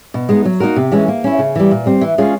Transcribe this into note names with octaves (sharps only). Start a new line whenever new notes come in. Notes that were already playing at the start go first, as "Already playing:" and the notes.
B2
G#3 B3 D#4
F#3
A#3 D#4 F#4 A#4
C3
E3 G#3 C#4
A#3
C#4 E4
C#3
E3 G3
A#2
G3 C4
E3
G#3 C#4 F4 G#4